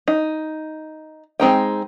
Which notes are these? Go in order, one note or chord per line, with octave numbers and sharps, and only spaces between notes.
D#4
G#3 C4 D#4 G5